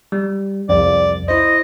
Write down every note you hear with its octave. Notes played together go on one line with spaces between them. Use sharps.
G3
C2 F2 D5
E4 C5 D#5